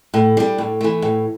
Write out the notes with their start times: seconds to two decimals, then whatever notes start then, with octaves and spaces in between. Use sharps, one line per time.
0.14 A2
0.37 G3 D4
0.58 A2
0.81 E3 A3
1.02 A2